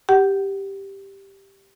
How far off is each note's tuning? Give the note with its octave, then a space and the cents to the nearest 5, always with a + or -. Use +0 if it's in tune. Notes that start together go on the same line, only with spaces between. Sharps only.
G4 +0 F#5 +25